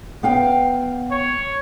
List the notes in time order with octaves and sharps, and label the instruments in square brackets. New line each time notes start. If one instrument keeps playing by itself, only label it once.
[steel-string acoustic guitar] B3 F5 G5
[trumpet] C#5